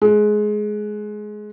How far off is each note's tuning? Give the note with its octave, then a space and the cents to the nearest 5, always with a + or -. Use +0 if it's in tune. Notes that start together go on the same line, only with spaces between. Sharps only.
G#3 +20